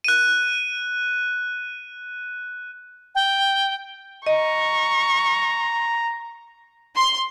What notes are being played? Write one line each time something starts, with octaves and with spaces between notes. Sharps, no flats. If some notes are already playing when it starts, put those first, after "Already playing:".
F#6 D#7
G5
D#5 A#5 C#6
C6